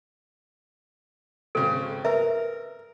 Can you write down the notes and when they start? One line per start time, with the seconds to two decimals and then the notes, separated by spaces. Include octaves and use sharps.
1.55 G#1 C#3 A4
2.05 A#4 B4 E5